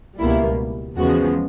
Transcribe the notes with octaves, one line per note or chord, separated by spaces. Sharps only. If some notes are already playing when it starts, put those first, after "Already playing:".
C#2 B2 G3 A#3 E4
E2 C#3 F3 G#3 B3 F#4